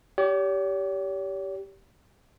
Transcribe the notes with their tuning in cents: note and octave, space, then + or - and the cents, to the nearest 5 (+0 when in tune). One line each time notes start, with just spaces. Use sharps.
G4 -5 C#5 +45